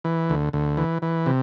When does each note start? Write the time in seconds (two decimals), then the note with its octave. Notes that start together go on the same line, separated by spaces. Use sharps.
0.05 E3
0.30 D2
0.53 D2
0.77 E3
1.02 E3
1.26 C3